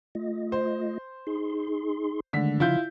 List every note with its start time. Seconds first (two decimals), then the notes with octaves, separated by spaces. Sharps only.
0.15 A3 F4 D#5
0.52 C5
1.27 D#4 G#4 C6
2.33 D3 D#3 G#3 A3 B6
2.60 C#3 F3 E4 F4 G6